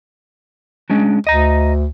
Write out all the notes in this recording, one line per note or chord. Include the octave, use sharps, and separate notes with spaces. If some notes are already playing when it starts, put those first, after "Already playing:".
G#3 C#4 D4
D2 D#5 A#5